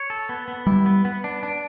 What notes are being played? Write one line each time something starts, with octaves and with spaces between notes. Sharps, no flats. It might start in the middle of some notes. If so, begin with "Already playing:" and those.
Already playing: C#5
A4
B3
B3
G3 E4
B3
B3
D4
D4